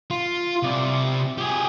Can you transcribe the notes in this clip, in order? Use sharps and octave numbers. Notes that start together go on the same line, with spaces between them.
F4
C3 D5
G4 G#4